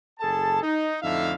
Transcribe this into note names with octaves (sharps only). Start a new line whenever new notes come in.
F#1 G#4 A4 A5
D#4
F2 A2 D3 D#4 E5 F5